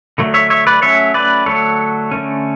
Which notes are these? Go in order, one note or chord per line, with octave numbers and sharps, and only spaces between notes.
D3 F#3 A3
C#5 E5
C#5 E5
B4 D5
F#3 A3 C#4 C#5 E5
B4 D5
D3 F#3 A3 A4 C#5
D3 A3 C#4